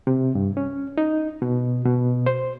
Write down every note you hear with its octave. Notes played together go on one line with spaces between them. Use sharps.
C3
G2
C#4
D#4
B2
B2
C5